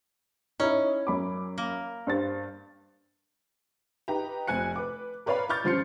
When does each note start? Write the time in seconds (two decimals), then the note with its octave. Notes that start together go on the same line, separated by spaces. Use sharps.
0.60 C#4 D#4 E4
1.07 F#2 B5 D6
1.58 A#3
2.07 G2 C5 A6
4.08 D#4 G4 B4 A#5
4.48 F1 C4 G#5 F#6 C#7
4.76 B4 D6
5.26 A#4 B4 C#5 D5 F5 B5
5.49 C#6 D6 F6 G6 A6
5.64 G2 F3 C#4 C6 C7 C#7